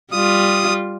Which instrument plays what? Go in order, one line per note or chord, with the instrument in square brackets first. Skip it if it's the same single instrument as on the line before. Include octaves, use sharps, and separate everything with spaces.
[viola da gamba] G3 F4 [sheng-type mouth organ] D#6